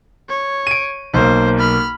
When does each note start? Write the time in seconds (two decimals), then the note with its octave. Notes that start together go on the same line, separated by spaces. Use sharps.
0.29 C#5
0.67 D7 D#7
1.14 B1 A#3 C5
1.59 B5 F6